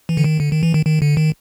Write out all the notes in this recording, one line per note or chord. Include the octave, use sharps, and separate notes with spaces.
E3
D3
D#3
D3
D#3
E3
D#3
D#3
D3
D#3